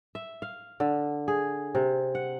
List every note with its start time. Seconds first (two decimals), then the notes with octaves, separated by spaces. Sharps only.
0.15 E5
0.42 F5
0.80 D3
1.28 G#4
1.75 C3
2.15 F#5